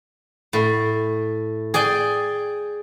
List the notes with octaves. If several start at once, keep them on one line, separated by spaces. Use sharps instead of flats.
A2
G#4 D5 G5 G#5